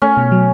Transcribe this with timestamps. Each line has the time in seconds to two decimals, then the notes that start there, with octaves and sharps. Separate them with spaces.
0.02 A3 C#4
0.17 B2
0.32 F#3